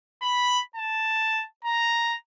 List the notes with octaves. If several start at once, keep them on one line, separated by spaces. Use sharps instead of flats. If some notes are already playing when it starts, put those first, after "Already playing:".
B5
A5
A#5